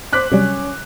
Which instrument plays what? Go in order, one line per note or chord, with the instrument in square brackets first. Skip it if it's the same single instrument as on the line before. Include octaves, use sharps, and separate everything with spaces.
[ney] C5 [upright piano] D6 F#6 B6
[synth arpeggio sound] C3 F#3 G3 [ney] C#4